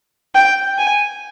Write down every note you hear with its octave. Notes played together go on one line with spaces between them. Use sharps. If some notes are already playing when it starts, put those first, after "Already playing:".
G5
G#5